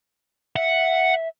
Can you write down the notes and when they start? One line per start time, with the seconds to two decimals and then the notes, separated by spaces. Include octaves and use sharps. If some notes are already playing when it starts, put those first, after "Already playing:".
0.56 E5 F#5